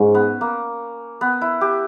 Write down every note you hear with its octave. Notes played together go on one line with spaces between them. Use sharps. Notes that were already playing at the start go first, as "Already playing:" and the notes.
Already playing: G#2 C#4
B3
A#3
B3
E4
G4